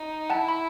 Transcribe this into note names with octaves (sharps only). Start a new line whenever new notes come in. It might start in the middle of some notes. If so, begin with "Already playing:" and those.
Already playing: D#4
E4 F#5 A5
B5